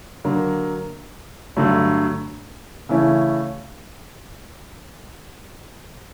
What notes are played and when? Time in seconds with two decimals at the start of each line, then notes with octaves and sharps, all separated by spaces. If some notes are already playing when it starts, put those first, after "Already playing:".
0.24 D3 F#3 A#3
1.56 G2 D3 F#3 A3
2.89 C#3 E3 A3 C#4 E4